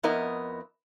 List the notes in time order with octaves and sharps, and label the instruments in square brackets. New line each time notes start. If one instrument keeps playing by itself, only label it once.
[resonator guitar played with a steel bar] F2 B3 E4 A#4 D#5